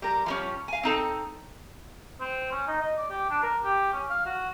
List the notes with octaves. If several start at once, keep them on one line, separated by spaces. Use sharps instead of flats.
G3 A#4
F3 G3 C#4
F5 G#5
C4 D#4 A4
C4
C#4
D#4
D#5
D5
G4
D4
A#4
G4
C#4
F5
F#4